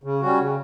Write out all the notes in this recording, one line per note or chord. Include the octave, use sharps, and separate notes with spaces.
C#3
G3 C#4 F#4
C#3